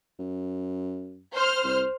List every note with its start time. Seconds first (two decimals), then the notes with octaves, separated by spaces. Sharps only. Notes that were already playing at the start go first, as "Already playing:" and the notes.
0.19 F#2
1.34 C5 F6
1.64 C2